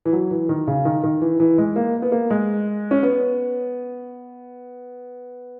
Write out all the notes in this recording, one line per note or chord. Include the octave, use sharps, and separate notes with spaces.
E3
F#3
E3
D#3
C#3
D#3
D#3
E3
E3
G#3
A#3
B3
A#3
G#3
C#4
B3